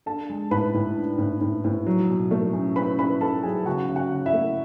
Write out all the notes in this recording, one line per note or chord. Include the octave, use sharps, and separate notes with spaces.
D4 A4 A5
G#3
A2 B4 B5
A2
D4
A2
A2
A2
F#3
B2
A3
C#4
C#4 B4 B5
C#4 B4 B5
C#4 A4 A5
F#3 G#4 G#5
C#3 F#4 F#5
C#3
F#4 F#5
C#3
E4 E5
A3